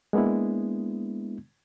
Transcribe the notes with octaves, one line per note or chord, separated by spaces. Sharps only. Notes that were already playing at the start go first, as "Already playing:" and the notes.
G#3 A#3 B3 D4 E4